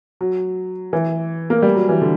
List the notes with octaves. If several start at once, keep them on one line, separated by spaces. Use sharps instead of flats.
F#3
E3
A#3
G3
F#3
E3
D3